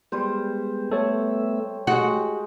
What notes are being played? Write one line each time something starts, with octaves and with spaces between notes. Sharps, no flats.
G3 G#3 B3 C5
A3 B3 A4 C#5 E5
G#3 F#4 G4